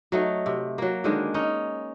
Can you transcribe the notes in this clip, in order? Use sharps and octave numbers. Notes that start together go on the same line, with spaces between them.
F#3 A3 D#4
C3
F#3 A#3
D3 D#3 G#3 D4
C#4 D#4